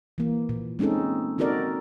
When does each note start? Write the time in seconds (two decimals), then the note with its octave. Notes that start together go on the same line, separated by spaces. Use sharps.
0.18 E3 A#3
0.49 A#2
0.79 G#3 C4 C#4 D#4 A4
1.38 C4 D#4 F#4 A4 A#4 D5